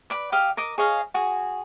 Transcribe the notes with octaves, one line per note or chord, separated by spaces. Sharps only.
B4 D5 B5
G4 D#5 F5
A#4 D#5 D6
G#4 C#5 D#5 F5
F#4 G#4